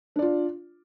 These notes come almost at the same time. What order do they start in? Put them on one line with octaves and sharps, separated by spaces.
D4 D5 F4